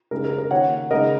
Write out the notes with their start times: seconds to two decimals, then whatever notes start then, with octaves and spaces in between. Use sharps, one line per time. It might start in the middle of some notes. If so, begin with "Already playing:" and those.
0.11 C#3 G#3 D#4 A#4
0.25 A#4
0.38 A#4
0.51 D#3 A#3 C#4 C#5 F#5
0.91 C#3 G#3 D#4 A#4 D#5